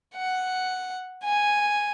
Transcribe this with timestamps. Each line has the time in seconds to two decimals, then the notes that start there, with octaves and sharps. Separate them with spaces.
0.16 F#5
1.24 G#5